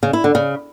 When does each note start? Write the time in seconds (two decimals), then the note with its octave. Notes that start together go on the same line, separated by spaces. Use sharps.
0.03 C#3
0.13 E4
0.24 D3
0.35 C#3